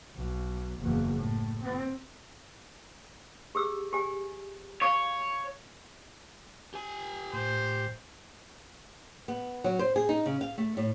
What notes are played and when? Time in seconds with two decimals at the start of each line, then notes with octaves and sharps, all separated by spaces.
0.16 B1
0.79 F#1 E2
1.15 A2
1.62 C4
3.55 G4 G#4 E6
3.93 G4 G#5
4.82 C#5 F5 C#6
6.74 G4 G#5
7.33 A2 C5
9.28 B3
9.64 F#3
9.79 C5
9.96 G#4
10.09 D#4
10.26 C#3
10.41 F5
10.58 A3
10.77 A2